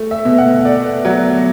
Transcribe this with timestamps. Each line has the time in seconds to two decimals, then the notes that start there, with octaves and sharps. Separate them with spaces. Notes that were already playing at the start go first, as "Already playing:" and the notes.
Already playing: A3
0.11 E5
0.25 B2
0.38 F#5
0.65 A3 D5
1.05 F#3 F#5